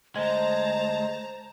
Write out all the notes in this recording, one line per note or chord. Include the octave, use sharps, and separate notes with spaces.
D2 G#3 C5 D#5 A5 A#5